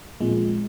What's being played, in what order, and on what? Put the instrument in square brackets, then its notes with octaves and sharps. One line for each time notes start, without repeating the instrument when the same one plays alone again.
[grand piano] A#2 F3 C4 F4 [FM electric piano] G#3